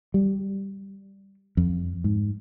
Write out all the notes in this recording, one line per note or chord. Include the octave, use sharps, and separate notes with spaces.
G3
F2
G#2